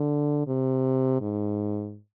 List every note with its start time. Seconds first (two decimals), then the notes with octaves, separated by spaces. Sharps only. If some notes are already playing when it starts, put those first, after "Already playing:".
Already playing: D3
0.47 C3
1.21 G#2